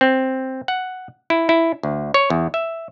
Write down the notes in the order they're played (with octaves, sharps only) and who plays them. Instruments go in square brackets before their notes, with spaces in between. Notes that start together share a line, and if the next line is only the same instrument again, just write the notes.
[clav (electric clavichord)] C4
F#5
E4
E4
D2
C#5
E2
E5